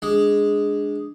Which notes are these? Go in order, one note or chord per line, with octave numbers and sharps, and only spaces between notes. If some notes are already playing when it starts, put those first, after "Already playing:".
G#3 D4